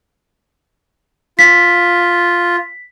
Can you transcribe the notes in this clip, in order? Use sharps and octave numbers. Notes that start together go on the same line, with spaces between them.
F4 B6